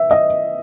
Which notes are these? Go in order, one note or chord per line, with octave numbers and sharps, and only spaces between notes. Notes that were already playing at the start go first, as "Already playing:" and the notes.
Already playing: E5
D#5